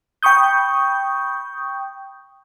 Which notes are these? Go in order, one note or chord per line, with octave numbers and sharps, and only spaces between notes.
G5 B5 C#6 D#6 G6